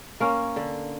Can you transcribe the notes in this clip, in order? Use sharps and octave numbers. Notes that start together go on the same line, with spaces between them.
A#3 C#4
D3